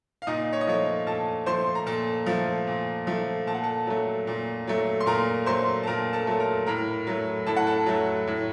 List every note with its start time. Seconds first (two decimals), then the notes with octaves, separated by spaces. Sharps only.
0.22 F5
0.27 A#2 D#4 D#5
0.53 C#5
0.61 D#5
0.67 F3 A3 C#5
1.06 A#2 A4 A5
1.46 F3 A3 C5 C6
1.75 A#5
1.86 A#2 A4 A5
2.26 F3 A3
2.67 A#2
3.07 F3 A3
3.47 A#2 A5
3.54 F#5
3.63 A4 A5
3.87 F#3 A3
4.27 A#2
4.67 F#3 A3
5.00 C6
5.06 A#2 A#4 A#5
5.46 F#3 A3 C5 C6
5.83 A5
5.87 A#2 A#4 A#5
6.13 A4 A5
6.27 F#3 A3 A5
6.40 A#4 A#5
6.66 A2 A#4 A#5
7.07 F#3 A3
7.46 A2 A5
7.57 F#5
7.67 A4 A5
7.86 F#3 A3
8.27 A2